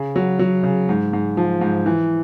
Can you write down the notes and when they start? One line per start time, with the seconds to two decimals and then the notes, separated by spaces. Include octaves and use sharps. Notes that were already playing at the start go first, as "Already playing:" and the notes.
Already playing: C#3
0.16 F#3
0.39 F#3
0.63 C#3
0.89 G#2
1.13 G#2
1.37 F3
1.61 G#2
1.86 E3